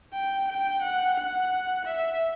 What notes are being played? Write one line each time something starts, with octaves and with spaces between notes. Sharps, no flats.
G5
G5
F#5
F#5
E5